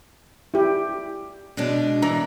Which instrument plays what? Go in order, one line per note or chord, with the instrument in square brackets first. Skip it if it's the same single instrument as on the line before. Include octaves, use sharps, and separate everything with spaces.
[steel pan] E4 G4
[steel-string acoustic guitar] B2 G#3 D4
[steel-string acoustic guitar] E3 [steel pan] A#5